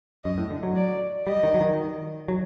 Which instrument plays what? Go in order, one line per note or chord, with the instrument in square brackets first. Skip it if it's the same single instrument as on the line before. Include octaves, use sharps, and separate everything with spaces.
[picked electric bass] F#2 [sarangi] D#5
[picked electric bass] A2
D3
F#3
[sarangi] D5
[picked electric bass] G3 [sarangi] D#5
[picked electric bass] D#3
F#3
D#3
F#3